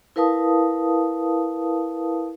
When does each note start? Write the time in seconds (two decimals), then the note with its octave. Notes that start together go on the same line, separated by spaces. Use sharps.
0.16 E4 A#4 B4 F5 A5 D#6